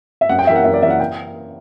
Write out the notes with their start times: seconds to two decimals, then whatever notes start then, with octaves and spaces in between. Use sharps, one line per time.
0.21 E5
0.29 F#2 F#5
0.39 G5
0.47 E3 A#3 E5
0.56 F#5
0.64 F#2 E5
0.74 D5
0.82 E3 E5
0.86 A#3 F#5
1.00 G5